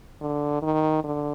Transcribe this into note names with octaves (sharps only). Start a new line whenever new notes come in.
D3
D#3
D3